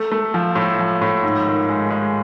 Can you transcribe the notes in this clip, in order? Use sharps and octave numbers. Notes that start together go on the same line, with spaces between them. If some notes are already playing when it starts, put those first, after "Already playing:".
Already playing: A3
A3
F3
A2
F3
A2
G#2
D#3
G#3
G#3